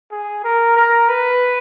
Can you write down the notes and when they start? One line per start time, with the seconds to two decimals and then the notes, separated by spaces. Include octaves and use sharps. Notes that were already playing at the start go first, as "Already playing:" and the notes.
0.11 G#4
0.44 A#4
0.76 A#4
1.09 B4